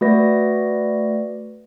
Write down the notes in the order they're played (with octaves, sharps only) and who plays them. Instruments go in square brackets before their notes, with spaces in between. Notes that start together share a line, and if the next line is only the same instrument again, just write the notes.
[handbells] A3 F#4 B4 D5 A#6